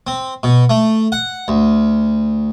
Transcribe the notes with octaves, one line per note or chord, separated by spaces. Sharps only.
C4
B2
A3
F#5
D2